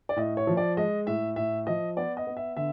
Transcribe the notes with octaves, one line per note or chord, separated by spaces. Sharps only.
D5
A2 D#5
C#5
F3
D5
G#3 D#5
A2 E5
A2 E5
F3 D#5
B3 D5
D#5
B3
E5
D3 E5